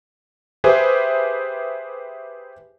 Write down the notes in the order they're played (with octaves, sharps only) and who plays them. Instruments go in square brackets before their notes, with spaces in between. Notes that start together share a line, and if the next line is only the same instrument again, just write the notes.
[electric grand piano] G4 G#4 B4 C5 E5 G#5